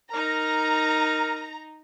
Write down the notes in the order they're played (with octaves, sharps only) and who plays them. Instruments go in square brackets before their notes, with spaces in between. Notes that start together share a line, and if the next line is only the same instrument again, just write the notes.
[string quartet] D#4 [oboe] A#4 [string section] A#5